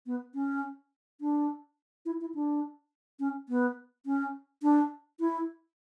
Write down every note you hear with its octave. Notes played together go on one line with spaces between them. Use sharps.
B3
C#4
D4
E4
E4
D4
C#4
B3
C#4
D4
E4